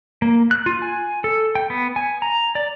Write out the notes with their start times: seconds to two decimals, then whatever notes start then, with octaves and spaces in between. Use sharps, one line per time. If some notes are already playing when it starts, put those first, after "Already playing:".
0.22 A#3
0.51 F#6
0.66 F4
0.82 G#5
1.24 A4
1.55 G5
1.70 B3
1.96 G#5
2.22 A#5
2.55 D5